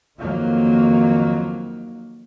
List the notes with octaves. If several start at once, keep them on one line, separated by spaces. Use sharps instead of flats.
F2 D#3 F#3 A#3